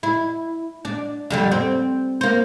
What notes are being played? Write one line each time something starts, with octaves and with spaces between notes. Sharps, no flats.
E4
D4
F2 D3 G3
C4
A#3 C5